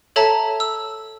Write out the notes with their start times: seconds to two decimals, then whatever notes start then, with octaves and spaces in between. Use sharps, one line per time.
0.16 A4 C#5 E5 A5 A#5
0.60 E6